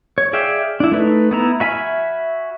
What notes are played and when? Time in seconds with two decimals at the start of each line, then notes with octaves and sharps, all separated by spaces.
0.18 C#5
0.33 G#4 D5 E5 F5 G5
0.80 D4 E4
0.92 A3 D#4 B4
1.31 B3 E4 A#5
1.60 F#4 E5 G#5 B5 F6